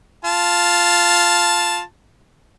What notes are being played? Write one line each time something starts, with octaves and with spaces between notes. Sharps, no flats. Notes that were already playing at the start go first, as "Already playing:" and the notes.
F4 A5